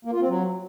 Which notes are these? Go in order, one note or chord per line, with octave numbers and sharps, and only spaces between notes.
A#3
F4
C4
F#3